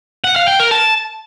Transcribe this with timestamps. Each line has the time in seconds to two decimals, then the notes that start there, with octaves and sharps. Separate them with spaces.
0.24 F#5
0.36 F5
0.48 G5
0.60 A#4
0.71 A5